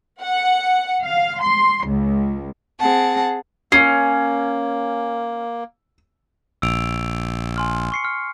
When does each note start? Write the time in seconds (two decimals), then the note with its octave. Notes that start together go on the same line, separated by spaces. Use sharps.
0.21 F#5
1.03 F5
1.43 C6
1.86 C#2
2.79 C4 G#4 F#5 A5
3.72 A#3 C#4 C7
6.62 A#1 E6 D7 F7
7.57 G#5 C6 F6
7.92 C#6 C7 C#7
8.05 F6